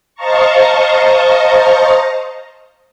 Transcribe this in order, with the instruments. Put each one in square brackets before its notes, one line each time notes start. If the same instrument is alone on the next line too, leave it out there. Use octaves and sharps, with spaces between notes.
[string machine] C5 D#5 F5 A5 A#5 C#6